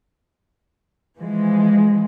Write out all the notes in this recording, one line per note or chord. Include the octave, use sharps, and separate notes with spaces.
E3 F3 G#3